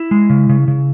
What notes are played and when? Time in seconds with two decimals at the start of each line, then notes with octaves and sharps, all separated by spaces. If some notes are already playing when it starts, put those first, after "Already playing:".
Already playing: E4
0.11 G#3
0.30 C#3
0.49 C#3
0.68 C#3